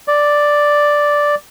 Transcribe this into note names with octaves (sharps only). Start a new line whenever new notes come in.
D5